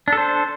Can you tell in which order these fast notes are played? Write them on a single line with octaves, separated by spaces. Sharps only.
D4 A4 C5